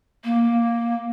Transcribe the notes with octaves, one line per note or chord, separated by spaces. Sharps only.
A#3